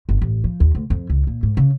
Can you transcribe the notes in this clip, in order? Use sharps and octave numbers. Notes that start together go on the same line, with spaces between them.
G1
A1
F3
D#2
D2
F2
C#2
A#2
G#2
C#3